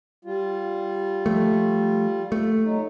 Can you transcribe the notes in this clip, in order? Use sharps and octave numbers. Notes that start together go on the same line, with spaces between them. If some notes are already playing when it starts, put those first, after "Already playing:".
G3 F4
F3 A3
A3
F#3 D#4